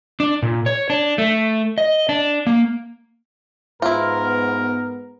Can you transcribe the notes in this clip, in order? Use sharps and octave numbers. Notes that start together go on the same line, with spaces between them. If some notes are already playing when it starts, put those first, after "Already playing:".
D4
A#2
C#5
D4
A3
D#5
D4
A#3
G#2 B3 E4 F4 A#4